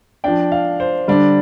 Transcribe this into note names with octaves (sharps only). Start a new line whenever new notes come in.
F3 D4 G5
F5
C5
D3 G3 D4